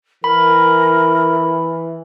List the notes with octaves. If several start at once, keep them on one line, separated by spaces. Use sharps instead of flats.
E3 A#4 B5